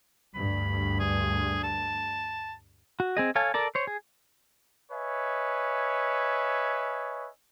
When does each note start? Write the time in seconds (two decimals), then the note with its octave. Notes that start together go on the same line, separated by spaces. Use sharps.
0.35 D2 G2 B5
1.00 G#4
1.63 A5
3.00 F#4
3.17 C4 G#4 D#5
3.35 A4 C#5 F5 G#5 A5
3.54 A4 A#4 D5 A5
3.75 C5 C#5
3.87 G#4
4.92 B4 C#5 D#5 E5 G#5